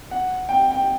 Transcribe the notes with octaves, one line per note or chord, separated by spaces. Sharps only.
F#5
G5
G5